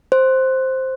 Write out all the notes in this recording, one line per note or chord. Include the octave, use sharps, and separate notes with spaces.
C5